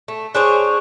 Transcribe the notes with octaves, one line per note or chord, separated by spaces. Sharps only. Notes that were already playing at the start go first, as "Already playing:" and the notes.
A3
D4 G#4 C5 C#5